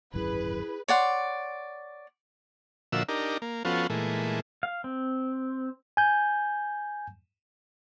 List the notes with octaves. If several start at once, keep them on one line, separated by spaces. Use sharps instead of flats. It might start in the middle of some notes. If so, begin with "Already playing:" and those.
D1 G#1 F#2 E4 G#4 B4
C#5 D5 F#5 C6
A#2 D3 F3 F#4 E5 E6
D4 D#4 G4 A#4
A#3
F3 B3 C#4 F4 F#4 A4
A#2 E3 G#3 A3
F5
C4
G#5 G6